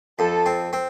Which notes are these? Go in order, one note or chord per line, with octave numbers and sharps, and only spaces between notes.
F2 A4
C4
C4